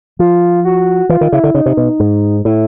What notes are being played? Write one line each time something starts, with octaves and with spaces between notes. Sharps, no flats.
F3 F4
F#4
E3 F4
D#3
C#3 E4
D3
C#3 D#4
C3
B2
G#2
A2 E4